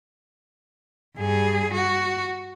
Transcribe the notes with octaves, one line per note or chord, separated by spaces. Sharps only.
G2 G#4
F#4